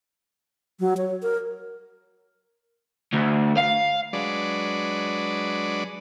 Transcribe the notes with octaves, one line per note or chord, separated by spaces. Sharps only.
F#3
C#5
A#4
D2
F5
F#3 G#3 D4 B4 D5